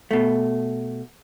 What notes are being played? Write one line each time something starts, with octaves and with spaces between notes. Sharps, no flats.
B2 A3